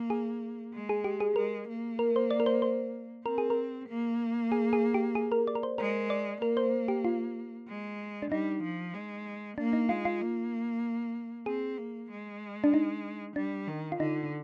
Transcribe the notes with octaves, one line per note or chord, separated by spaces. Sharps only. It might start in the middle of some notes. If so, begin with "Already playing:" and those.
Already playing: A#3
G#4
G#3
G#4
G4
G#4
G#3 A#4
A#3
A#4
C5
D5
A#4
C5
C5
C4 A#4
G#4
A#4
A#3
G#4
G#4
G4
G#4
A#4
D5
A#4
C5
G#3 A#4
D5
A#3 A#4
C5
G4
F4
G#3
D4
G3 D#4
F3
G#3
A#3 D4
D#4
G#3 F4
F4
A#3
C4 G#4
A#3
G#3
D4
D#4
G3 D4
D#3
F4
D3 D#4